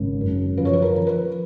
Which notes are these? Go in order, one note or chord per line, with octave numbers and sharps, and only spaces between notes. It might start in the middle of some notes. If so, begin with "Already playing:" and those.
Already playing: G#1 C#3
F#2
F3 B4
C#5
B4
A#4
F3
B4